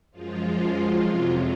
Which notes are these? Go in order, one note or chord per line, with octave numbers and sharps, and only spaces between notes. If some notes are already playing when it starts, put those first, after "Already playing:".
F#2 F3 G#3 F4
F2 C3 F#3